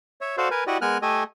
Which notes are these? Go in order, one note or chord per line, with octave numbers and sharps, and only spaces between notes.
C#5 E5
F#4 A4 C5 D5 F5
A#4 B4 G#5
E4 F#4 G4 D5 D#5
G#3 B3 A#4 G#5 F6 F#6
A3 G4 A4 D#5 G#5